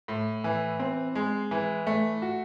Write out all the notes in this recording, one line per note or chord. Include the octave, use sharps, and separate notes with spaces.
A2
E3
C4
G#3
E3
A3
F#4